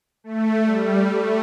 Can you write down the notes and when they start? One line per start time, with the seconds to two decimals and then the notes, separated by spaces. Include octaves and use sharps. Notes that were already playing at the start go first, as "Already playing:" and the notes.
0.24 A3
0.66 G3
1.10 A3